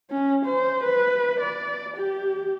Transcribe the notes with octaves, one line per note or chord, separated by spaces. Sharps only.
C#4
C5
B4
D5
G4